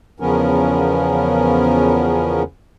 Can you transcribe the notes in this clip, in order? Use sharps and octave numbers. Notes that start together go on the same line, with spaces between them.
E2 C#3 F3 B3 C#4 A#4